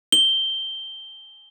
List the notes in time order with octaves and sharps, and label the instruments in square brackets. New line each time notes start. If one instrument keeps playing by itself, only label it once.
[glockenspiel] G7